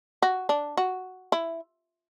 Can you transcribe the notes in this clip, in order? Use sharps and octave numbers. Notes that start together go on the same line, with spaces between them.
F#4
D4
F#4
E4